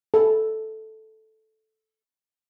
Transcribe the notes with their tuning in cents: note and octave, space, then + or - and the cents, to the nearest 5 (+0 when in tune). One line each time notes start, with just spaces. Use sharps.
A4 -5